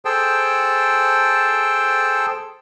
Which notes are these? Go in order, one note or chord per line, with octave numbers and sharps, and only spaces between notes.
G#4 A4 C5 G5 A5